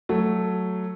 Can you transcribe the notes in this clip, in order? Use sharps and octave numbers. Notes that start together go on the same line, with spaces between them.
F#3 A3